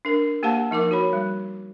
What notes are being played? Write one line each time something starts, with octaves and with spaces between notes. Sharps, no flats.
D4 A#4
A#3 G4 F5 F#5 A5
F3 D#4 A#4 D6
F#4 C#5 B5
G3